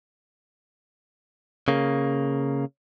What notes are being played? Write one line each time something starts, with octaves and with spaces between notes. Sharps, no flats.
C#3 A#3